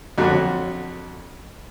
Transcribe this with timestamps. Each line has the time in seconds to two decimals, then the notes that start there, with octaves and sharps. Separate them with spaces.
0.18 F2 D3 F#3